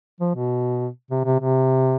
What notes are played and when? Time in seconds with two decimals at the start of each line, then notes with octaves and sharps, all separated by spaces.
0.20 F3
0.35 B2
1.11 C3
1.25 C3
1.40 C3